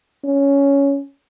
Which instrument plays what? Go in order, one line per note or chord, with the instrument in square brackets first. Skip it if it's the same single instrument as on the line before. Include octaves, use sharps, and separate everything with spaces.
[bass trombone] C#4